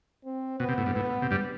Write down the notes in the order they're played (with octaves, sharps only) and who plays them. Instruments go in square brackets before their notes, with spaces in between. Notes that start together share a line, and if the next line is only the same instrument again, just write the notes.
[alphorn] C4
[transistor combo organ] B2 [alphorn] B3
[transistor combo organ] C3
A2
G2
[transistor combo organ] A2 [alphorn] B3
[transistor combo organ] C3
G2 G3